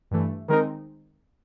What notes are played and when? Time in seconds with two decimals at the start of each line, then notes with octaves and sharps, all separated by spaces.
0.11 G2 E3 A3
0.49 D#3 G#3 C4 D#4 A#4